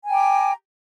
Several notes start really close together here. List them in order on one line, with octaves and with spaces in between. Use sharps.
G#5 A#5 G5 D6